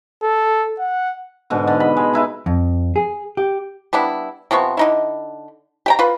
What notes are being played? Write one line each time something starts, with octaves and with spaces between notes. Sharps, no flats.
A4
F#5
G#2 B2 D3
D3
D#5 B5
G#3
D#4 E4 B4
F2
G#4
G4
G3 B3 D4 E4
C3 F3 B3 C#6
D3 D#4 E4
G4 G5 A#5
F4 B4